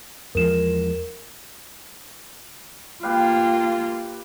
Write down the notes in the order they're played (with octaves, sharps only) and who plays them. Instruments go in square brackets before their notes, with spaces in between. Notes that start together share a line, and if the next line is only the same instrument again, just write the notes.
[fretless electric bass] E2 F3 G#3 [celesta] A#4 E7
[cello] A#3 F4 [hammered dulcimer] G4 B4 F5